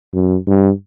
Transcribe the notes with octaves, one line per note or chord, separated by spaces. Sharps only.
F#2
G2